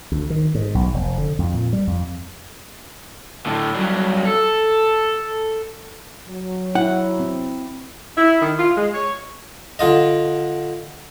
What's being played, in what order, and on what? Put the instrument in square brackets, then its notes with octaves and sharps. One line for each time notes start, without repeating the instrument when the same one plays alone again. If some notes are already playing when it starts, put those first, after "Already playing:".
[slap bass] D2
D#3
G#2
B1
F1
D3
F2
A#2
G3
F2
[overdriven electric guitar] A2 D3
G2 F#3
A4
[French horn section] F#3
[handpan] E4 [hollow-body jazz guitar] F#5
[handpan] C4
[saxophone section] E4
D#3
F4
G#3
C#5
[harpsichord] D3 F4 D#5